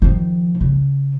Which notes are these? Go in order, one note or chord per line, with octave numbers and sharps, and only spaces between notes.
D#3 F3
C#3